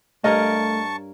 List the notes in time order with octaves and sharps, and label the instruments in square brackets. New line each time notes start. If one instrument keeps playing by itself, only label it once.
[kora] G2 A#4 C#5 [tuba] A3 [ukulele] D#5 [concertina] A5 C#6